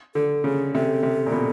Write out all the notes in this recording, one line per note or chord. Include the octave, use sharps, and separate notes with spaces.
D3 A4
C#3 G#4
C3 A4
C3
A#2
B2